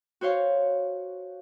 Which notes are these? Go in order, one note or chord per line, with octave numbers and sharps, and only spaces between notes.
F#4 C5 C#5 F5